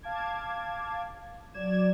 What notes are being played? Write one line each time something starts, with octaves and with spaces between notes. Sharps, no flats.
F5 A5 D6 G#6
F#3 D5 G#6 E7